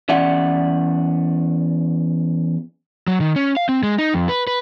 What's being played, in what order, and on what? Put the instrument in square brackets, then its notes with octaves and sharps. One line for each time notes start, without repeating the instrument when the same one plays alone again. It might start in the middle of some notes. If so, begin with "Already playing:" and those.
[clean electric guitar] E2 C#4 D5 E5 F#5
[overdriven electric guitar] F#3
D#3
C#4
F5
C4
G#3
D#4
F2
B4
B4